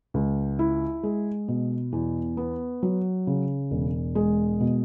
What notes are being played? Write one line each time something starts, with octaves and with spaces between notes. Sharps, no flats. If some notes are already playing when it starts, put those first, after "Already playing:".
C#2
E4
G#3
B2
E2
B3
F#3
C#3
E1
G#3
B2